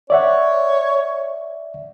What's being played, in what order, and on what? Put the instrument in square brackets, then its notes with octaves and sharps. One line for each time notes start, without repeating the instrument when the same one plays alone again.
[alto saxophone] C#5 [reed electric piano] D5 E5 F#5